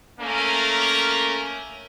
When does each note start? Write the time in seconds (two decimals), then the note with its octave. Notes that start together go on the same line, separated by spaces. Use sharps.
0.20 A3 A#3 C#4 A#4